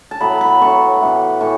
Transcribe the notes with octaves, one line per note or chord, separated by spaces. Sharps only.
A5
A2 F#3 B3 B5
B5
A2 F#3 B3 C#6
A2 E3 B3
A2 E3 C#6